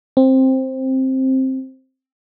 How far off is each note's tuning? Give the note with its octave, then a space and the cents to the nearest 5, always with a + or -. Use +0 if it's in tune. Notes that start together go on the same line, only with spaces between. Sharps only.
C4 +10